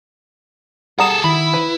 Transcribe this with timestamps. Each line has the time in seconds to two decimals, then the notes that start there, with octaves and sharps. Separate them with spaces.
0.99 G3 G#4 A4 F#5 A#5 D#6 E7
1.24 D#3 E4 B5
1.54 B4